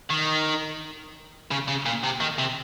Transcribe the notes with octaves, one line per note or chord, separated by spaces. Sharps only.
D#3
C#3
C#3
A#2
C3
D#3
C3